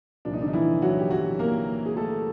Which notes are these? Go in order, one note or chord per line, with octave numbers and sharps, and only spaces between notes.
C2 A#2 F3 D4
D#4
D3 D4
D#4
E3 E4
F#3 F#4
G4
F#3 F#4
A#3 A#4
G#4
A3 A4